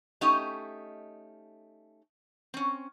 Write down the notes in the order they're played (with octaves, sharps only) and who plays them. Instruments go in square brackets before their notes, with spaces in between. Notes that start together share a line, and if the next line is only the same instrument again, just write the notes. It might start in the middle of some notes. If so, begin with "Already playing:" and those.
[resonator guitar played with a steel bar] A3 C#4 D#4 G4 D#5 F5
C4 C#4